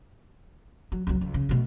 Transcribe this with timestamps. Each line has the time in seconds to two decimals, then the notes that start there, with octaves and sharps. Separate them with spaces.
0.92 F#3
1.07 C#2 F#3
1.21 C#2
1.34 C#3
1.49 B2 A3